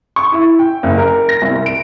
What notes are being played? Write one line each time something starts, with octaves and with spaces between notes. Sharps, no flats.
C#6
E4
G5
F#1
A#4
A#6
C2
D7